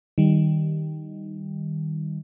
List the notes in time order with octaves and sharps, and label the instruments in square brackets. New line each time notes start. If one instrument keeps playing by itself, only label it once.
[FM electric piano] D#3 G3